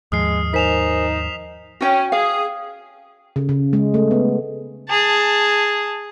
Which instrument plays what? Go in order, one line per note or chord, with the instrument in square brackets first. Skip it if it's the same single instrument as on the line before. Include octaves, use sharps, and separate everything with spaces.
[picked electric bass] D#2 G#2 F3 [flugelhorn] G#3 [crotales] D#6 F6 C7
[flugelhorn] D#4 [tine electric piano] A#4 C5 G#5 [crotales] B6 E7 F7
[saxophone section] C#4 [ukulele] F#4 G5
[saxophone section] G#4 [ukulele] F5
[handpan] C#3
C#3
G#3
A3
B3
[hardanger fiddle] G#4 A5